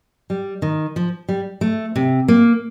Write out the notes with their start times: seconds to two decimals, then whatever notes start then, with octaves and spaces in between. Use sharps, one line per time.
0.30 G3
0.62 D#3
0.96 F3
1.29 G3
1.61 A3
1.96 C3
2.28 A#3